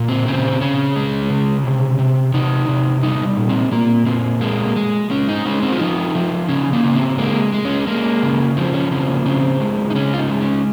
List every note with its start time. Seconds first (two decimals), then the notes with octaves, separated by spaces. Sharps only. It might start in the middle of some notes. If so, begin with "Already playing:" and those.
Already playing: A#2
0.08 C4
0.26 C#3 C4
0.61 C#3 C#4
0.96 G#3
1.30 C#3
1.64 C3
1.99 C3
2.34 C3 D#4
2.68 C3
3.03 G3 D#4
3.37 A#2
3.49 C4
3.72 A#2 A#3
4.06 A#2 C4
4.41 G#3 A#3
4.76 G#3
5.10 G#3 C#4
5.28 D#4
5.46 G#3 C#4
5.62 C4
5.73 F4
5.80 F3 D#4
6.15 F3
6.49 C#3 C#4
6.73 A#3
6.84 C#3
6.95 C4
7.18 G#3 A#3
7.53 G#3
7.65 C#4
7.87 G#3 A#3
8.23 C#3
8.57 F3 C4
8.74 C#4
8.91 C#3 C4
9.09 A#3
9.26 C#3 C4
9.60 G#3
9.90 D#4
9.95 C#3 C#4
10.14 F4
10.18 D#4
10.30 G#3
10.41 C#4